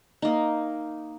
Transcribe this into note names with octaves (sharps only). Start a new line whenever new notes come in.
A#3 D#4